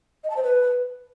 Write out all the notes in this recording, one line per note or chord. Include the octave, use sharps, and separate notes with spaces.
D#5
A5
C5
B4